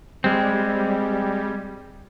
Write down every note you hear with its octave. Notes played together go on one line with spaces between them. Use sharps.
G3 G#3 C4